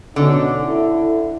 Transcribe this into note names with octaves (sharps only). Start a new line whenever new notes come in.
B2 D3 C#4 D#4
E4 A4